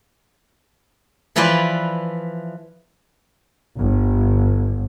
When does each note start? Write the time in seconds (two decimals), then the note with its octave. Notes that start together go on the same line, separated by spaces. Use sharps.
1.36 E3 F3 E4 F4 B4 D5
3.77 G1